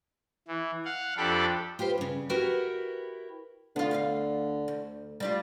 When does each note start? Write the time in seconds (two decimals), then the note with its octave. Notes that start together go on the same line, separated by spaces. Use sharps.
0.48 E3
0.85 F5 F#5
1.17 F2 D4 G4 A4 B5
1.79 F4 G4 B4 C5
1.98 G2 C#3
2.29 E4 F#4 G4 A#4 B4
3.76 D3 B3 F4
3.91 D2 G4 F5
4.68 D2
5.20 G3 D4 F4